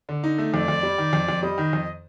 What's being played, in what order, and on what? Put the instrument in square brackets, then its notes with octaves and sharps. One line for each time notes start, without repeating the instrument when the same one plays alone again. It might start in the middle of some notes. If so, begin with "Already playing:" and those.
[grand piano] D3
D#4
A3
[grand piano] F2 [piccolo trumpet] D5
[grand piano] F2
G3
D#3
F2
F2
[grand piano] G3 [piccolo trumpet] D#5
[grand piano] D#3
F2